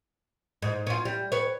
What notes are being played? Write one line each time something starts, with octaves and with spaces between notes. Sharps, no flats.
G#2
C#4 F4
G3
B4 C#5